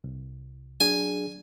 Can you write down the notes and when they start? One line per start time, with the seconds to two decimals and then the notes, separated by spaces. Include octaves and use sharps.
0.04 C2
0.80 F#3 D4 G#4 G#5